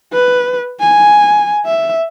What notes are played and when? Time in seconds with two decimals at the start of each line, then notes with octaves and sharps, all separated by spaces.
0.13 B4
0.80 G#5
1.66 E5